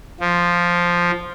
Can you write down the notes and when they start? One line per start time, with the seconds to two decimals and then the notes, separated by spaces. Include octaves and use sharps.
0.20 F3